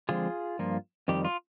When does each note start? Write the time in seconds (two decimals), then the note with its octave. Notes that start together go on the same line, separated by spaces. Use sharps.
0.09 D3 F3 G#3 C4 F4 G#4
0.59 G2 F3 A#3
1.08 F2 D#3 G3 G4
1.25 F4